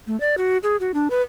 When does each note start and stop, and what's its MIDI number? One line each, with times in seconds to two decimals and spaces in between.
0.07 0.19 57
0.20 0.35 74
0.38 0.58 66
0.63 0.76 68
0.80 0.92 66
0.94 1.08 62
1.10 1.22 71